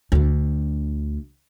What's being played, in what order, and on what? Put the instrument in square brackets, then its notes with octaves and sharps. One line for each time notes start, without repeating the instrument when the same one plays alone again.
[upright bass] D2 D3